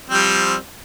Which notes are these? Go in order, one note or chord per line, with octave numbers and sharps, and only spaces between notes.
F3 G3 C4